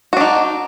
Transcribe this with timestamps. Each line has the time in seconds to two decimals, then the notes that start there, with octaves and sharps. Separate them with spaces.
0.13 F#4
0.17 D4
0.21 D#4